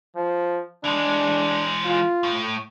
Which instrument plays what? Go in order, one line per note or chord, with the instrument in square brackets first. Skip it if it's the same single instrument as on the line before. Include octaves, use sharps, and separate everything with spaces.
[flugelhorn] F3
[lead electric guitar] E3 G#3 [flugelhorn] D4
[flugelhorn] F4
[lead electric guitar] A2